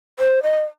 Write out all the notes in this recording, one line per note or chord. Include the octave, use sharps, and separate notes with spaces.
C5
D#5